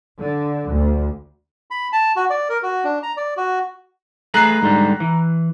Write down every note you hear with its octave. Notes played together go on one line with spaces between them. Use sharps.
D3
D2
B5
A5
F#4
D5
A#4
F#4
D4
A#5
D5
F#4
A3 G#4 B4 A#5 F#6 C7
G#2 D3 G3
E3